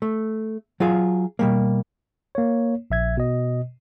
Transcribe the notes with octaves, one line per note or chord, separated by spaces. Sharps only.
A3
F#3 F4 G#4 F5
B2 G3 A#3
A#3 C#5
A#1 E5 G#6
B2 D#5